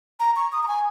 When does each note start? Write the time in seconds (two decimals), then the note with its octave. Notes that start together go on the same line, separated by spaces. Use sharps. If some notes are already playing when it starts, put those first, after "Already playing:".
0.20 A#5
0.36 C#6
0.52 D#6
0.63 A#5
0.68 G#5